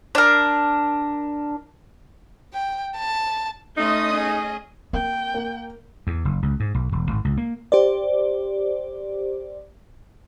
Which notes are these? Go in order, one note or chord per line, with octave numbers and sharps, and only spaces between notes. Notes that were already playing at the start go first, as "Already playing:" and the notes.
D4 A#4
G5
A5
A3 C#4 D#4 D#5 E5 C6 D#6
D#4 G#4
A#3 C4 G5
A#3
E2
F#1
C#2
G#2
B1
E1
G#1
C#2
A#3
G4 C5 D5